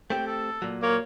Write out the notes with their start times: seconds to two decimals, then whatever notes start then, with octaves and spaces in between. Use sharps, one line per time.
0.10 A3 C4 G4 G5
0.26 A4
0.62 A#2 F#3
0.83 A#3 C#5